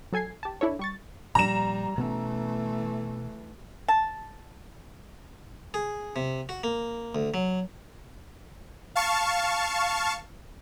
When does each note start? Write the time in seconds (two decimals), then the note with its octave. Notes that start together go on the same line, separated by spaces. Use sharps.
0.13 F#3 A4 G#5 G#6 C7
0.43 G4 A5
0.61 D4 E4 A4 C#5
0.79 G3 C#6 A6
1.35 A#2 F3 G3 A#5 E7
1.98 B2 E3 A3 B3 C#4
3.88 A5
5.74 G#4
6.16 C3
6.49 F#4
6.64 A#3
7.15 D2
7.34 F#3
8.95 F5 A5 C#6